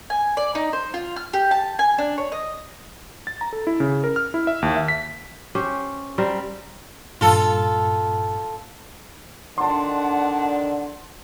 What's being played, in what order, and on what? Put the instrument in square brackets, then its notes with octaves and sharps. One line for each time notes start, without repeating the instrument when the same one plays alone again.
[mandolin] G#5
D5
D#4
C5
F4
F6
G4
A5
G#5
D4
C#5
D#5
[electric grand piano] A6
A#5
A4
E4
C#3
A#4
F6
E4
E5
D#2
E5
B6
[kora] C#4 G4 C5
G3 C4 A#4 C5
[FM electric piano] G2 A#2 [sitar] F4 A4
[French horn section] D3 D#3 D4 [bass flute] F#5 [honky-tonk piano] A5 C6